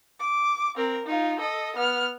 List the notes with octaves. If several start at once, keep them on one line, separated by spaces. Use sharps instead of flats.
D6
C4 A#4
D#4 F4
A4 D#5
B3 F6